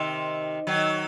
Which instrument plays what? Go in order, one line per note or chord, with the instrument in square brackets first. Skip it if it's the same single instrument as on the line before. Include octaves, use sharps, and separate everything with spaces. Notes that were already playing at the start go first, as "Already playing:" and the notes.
Already playing: [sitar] C3 D#3
D#3 F#3